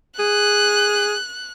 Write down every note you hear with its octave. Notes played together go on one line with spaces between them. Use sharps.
G#4 F#6